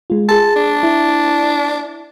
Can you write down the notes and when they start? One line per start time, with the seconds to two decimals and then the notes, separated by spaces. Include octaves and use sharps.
0.10 G#3 F4
0.28 G#4 A5 C6
0.56 D4
0.83 E4